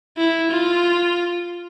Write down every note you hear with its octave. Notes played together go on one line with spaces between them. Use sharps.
E4
F4